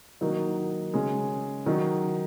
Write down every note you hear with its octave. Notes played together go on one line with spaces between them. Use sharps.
D#3 F#3 A#3 D#4 F#4
C#3 G#3 C#4 G#4
D#3 F#3 D#4 F#4